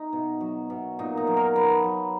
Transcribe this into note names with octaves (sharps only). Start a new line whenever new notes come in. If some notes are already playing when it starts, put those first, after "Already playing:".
Already playing: D#4
B2
F#3
B2
A#2 D#4
D#4
F#3
A#4
F#3 B4
F#3